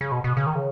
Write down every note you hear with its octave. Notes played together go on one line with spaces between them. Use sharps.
C#3
B2
B2
C#3
D#3
C#3